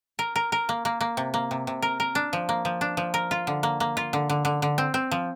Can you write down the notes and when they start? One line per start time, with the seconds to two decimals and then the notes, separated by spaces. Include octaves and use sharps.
0.19 A#4
0.36 A#4
0.52 A#4
0.69 A#3
0.85 A#3
1.01 A#3
1.17 C3
1.34 A#3
1.51 C3
1.67 C3
1.82 A#4
2.00 A#4
2.15 D4
2.33 F3
2.49 A#3
2.65 F3
2.81 D4
2.97 F3
3.14 A#4
3.31 F4
3.47 D3
3.63 A#3
3.80 A#3
3.97 F4
4.13 D3
4.30 D3
4.45 D3
4.62 D3
4.78 C4
4.94 C4
5.11 F3